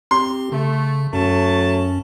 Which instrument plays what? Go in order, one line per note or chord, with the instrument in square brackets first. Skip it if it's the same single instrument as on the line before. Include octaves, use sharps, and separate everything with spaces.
[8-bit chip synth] C4 G4 [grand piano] C6
[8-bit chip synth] C#3 [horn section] A3
[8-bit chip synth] F#2 C#4 [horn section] F#3 A3 A5